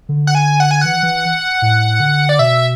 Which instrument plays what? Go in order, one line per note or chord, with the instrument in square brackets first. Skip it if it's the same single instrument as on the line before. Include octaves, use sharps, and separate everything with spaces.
[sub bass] D3
[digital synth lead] F#5
G#5
F#5
G#5
[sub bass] E3 [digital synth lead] F#5
[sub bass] E3
A2
D3
[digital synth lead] D5
[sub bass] B2 [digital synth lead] E5